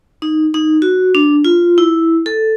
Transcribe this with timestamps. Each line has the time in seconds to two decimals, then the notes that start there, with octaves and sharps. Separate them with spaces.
0.22 D#4
0.54 D#4
0.82 F#4
1.15 D4
1.45 F4
1.78 E4
2.26 A4